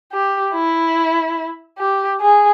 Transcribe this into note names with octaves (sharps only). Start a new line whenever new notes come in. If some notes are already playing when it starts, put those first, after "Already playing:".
G4
E4
G4
G#4